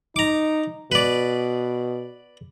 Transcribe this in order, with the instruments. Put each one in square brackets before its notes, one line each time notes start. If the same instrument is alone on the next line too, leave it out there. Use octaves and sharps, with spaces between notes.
[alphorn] D#4 [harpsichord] A#5 D6
[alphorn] B2 [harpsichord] B4 D5